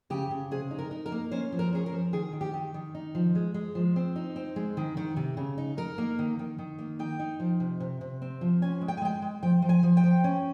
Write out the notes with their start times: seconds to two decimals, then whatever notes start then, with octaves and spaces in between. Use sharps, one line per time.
0.10 C#3 G4
0.31 C#3
0.51 C3 G#4
0.71 D#4
0.79 A#4
0.91 D#4
1.06 A#4
1.12 A#3
1.31 C#4 C5
1.52 F3
1.59 A#4
1.73 C#4 G#4
1.86 A#4
1.92 F3
2.13 D#3 G#4
2.33 D#3
2.41 G4
2.54 D#3
2.74 D#3
2.95 D#4
3.15 F3
3.35 G#3
3.54 G#3
3.75 F3
3.96 C4
4.16 D#4
4.36 C4
4.56 G#3
4.77 D#3
4.97 D#3
5.16 C3
5.37 C#3
5.58 D#4
5.77 D#4 A#4
5.98 A#3
6.19 D#3
6.39 D#3
6.58 D#3
6.79 A#3
6.99 D#4 G5
7.19 D#4
7.40 F3
7.60 C3
7.80 C3
8.01 C3
8.22 C4
8.41 F3
8.62 C#4 G#5
8.81 G#3
8.88 G5
8.97 G#5
9.02 G#3 G5
9.22 G#3
9.43 F3 G5
9.62 F3
9.69 G#5
9.83 F3
9.97 G5
10.04 F3
10.24 C#4